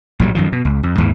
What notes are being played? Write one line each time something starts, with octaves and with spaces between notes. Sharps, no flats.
A#1 A2 F#3 G3
F#2 D#3 F3
B2
C#2
F2
D#2 G#2 E3